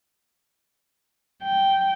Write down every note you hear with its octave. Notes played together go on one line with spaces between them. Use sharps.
G5